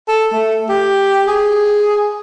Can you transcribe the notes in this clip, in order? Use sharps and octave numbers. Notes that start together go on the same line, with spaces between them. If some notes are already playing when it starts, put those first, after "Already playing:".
A4
A3
G4
G#4